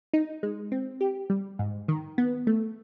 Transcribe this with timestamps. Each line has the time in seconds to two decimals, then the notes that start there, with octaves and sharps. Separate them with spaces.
0.13 D#4
0.43 G#3
0.72 C4
1.01 G4
1.30 G3
1.59 G#2
1.88 D#3
2.18 B3
2.47 A3